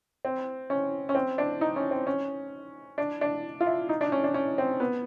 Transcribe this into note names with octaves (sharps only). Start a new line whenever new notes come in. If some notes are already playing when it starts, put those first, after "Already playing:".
C4
C#4
C#4
C4
D4
D#4
C#4
C4
C#4
D4
D4
F4
E4
D#4
D4
C#4
D4
C#4
C4
B3